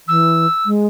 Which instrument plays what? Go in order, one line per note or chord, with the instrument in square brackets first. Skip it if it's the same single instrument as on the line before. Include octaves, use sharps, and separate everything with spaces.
[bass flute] E3 [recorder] E6
[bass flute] G#3